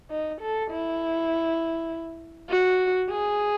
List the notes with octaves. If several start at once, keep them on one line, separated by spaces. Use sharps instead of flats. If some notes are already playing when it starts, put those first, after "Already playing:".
D#4
A4
E4
F#4
G#4